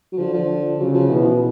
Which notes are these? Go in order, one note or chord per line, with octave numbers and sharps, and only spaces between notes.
F#3
D3 F3
F3
C#3 F#3
F3
B2 E3